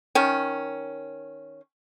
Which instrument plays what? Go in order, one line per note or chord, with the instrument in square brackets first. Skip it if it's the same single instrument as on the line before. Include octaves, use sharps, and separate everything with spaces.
[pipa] D#3 C#4